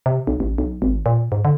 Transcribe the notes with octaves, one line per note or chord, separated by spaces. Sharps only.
C3
B1
A1
B1
G#1
A#2
G#2
D3